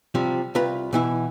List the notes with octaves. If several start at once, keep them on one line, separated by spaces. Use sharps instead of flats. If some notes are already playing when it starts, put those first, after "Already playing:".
C3 F3 G3
C2 F4 B4 A#5
B2 E3 E4